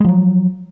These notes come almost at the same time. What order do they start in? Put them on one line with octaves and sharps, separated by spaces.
G#3 F3 F#3